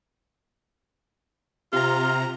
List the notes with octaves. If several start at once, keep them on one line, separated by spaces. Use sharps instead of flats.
C3 F4 A#5